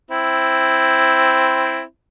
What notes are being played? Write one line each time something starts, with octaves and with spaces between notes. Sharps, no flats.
C4 E4